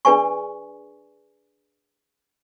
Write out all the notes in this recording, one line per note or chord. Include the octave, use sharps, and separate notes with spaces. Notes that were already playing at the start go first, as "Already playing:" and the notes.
D4 G#4 B4 D5 G#5 C#6